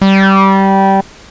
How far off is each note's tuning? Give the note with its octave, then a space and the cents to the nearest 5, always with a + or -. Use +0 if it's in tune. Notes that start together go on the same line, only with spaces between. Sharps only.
G3 -15